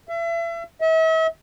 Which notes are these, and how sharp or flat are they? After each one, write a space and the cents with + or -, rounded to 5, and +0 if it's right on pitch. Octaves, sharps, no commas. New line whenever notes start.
E5 +35
E5 -40